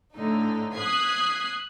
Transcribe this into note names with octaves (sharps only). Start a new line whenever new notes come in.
A2 D3 D#4
D#6 F#6 G#6 B6 C7